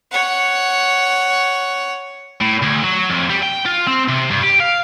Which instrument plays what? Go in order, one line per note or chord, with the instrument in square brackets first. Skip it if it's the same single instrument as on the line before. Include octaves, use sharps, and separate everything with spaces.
[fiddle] C#5 F#5
[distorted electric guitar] A2
D2
F#3
F2
G3
G5
F4
C4
C3
G2
G4
F5